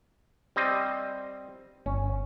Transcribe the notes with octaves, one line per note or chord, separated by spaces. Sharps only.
G3 C4 D#5
G1 C#4